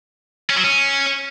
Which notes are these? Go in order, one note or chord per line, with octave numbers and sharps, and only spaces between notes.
C#4
F#3
C#4